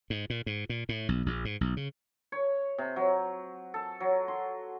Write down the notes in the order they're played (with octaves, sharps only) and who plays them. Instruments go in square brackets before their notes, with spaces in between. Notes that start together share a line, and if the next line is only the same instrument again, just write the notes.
[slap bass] G#2
A#2
G#2
A#2
A2
B1
A#1
G#2
B1
C#3
[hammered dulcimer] C#5
C3
F#3
A4
F#3
C6